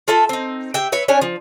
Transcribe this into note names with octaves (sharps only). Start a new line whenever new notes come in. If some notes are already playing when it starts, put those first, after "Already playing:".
F4 A4 E5 A5
C4 D#4
C3 E5 G5
B4 C#5 E5
C#4 D4 C#5 G#5
F3